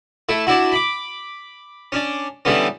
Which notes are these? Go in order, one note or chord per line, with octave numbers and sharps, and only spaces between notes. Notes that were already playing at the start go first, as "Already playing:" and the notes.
A3 E4
D4 E4 F#4
B5 D6
C#4 D4
D3 E3 G3 B3 C#4